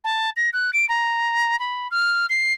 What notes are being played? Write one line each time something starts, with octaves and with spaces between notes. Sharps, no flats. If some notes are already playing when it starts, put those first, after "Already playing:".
A5
A#6
F#6
D7
A#5
B5
F6
C7